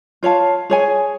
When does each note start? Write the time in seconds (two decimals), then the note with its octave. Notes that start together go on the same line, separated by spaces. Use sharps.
0.23 F4 C#5 F5 A5
0.70 G#4 C#5 G#5